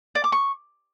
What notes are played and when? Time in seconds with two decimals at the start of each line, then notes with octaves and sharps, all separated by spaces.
0.15 D5
0.24 D6
0.32 C#6